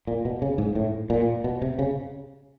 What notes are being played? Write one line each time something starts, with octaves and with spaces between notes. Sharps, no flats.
A#2
B2
C#3
G#2
A2
A#2
B2
C3
C#3